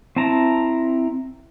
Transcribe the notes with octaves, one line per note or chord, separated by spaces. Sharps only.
C4 E4 A5 A#5